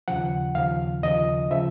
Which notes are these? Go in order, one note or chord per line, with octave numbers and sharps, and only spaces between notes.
D#2 C#3 F3 F#5
D#2 C#3 F3 F5
D#2 C#3 F3 D#5
C#3 F3 E5